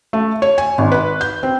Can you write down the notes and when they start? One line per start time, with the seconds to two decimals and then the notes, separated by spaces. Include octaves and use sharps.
0.13 A3
0.42 C#5
0.58 G#5
0.78 G#1
0.92 B4
1.21 G6
1.43 C4